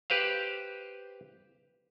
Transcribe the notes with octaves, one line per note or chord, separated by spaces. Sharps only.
G4 B4 C5 F5